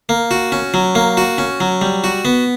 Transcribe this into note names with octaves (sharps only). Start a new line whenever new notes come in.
A#3
F#4
C#4
F#3
A#3
F#4
C#4
F#3
G3
F#4
B3